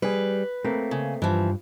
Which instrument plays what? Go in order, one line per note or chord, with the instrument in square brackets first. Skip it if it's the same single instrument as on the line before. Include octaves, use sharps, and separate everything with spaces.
[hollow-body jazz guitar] G3 G#4 [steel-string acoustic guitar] B4
[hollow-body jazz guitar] A3 A#3 C4
[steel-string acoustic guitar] C#3
[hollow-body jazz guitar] G2 [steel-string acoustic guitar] E3 F3